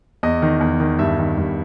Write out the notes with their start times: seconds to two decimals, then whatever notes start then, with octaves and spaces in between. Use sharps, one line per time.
0.23 E2 D#5
0.42 D#3
0.61 E2
0.80 D#3
0.99 G2 E5
1.18 D#3
1.38 G2